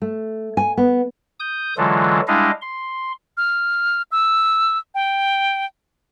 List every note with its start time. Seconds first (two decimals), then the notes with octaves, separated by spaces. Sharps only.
0.02 A3
0.57 G#5
0.77 B3
1.40 D#6 G6
1.77 D3 E3 F#3 G#3 F4 A4
2.28 G3 G#3 D4 E4 D#5 F5
2.61 C6
3.37 F6
4.12 E6
4.95 G5